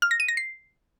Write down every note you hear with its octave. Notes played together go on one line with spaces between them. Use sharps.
F6
A#6
D#7
A#6
C7